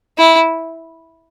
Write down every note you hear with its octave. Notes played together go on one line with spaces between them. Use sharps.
E4